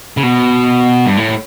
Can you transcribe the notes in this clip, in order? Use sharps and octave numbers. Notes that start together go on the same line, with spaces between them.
C#3
B2
G2
A2